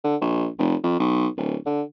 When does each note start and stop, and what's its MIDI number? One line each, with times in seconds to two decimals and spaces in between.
0.04 0.16 50
0.21 0.47 34
0.59 0.75 29
0.84 0.97 41
0.99 1.27 35
1.37 1.56 26
1.66 1.82 50